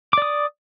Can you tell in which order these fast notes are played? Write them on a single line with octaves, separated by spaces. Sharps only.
D6 D5 D#6